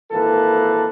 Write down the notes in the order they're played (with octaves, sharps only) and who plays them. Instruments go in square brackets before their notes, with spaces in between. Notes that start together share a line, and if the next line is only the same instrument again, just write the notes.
[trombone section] G#1 E3 A#3 A4 B4